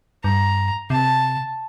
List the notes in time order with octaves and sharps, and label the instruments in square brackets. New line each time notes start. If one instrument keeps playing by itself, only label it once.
[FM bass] G2 [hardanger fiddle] A#5
[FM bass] C3 [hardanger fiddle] A5